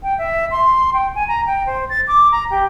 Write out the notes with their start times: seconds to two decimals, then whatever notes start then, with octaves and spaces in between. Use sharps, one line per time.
0.03 G5
0.18 E5
0.51 C6
0.93 G5
1.15 G#5
1.28 A#5
1.46 G5
1.66 C5
1.89 A6
2.07 D6
2.32 A#5
2.51 G4